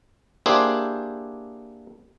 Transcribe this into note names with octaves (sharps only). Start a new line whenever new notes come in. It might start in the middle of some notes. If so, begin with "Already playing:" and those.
A#3 D4 E4 G4 G#4 C5